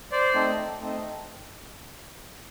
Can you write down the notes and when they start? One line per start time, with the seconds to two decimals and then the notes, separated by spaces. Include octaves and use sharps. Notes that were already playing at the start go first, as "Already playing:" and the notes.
0.12 C5 D5
0.34 A3 C4 D#4
0.80 A3 C4 D#4